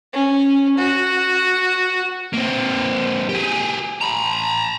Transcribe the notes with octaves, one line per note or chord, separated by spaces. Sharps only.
C#4
F#4
A#3 C4
G4 G#4
A#5 B5